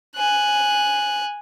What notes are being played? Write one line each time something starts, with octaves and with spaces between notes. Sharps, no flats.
G#5 F#6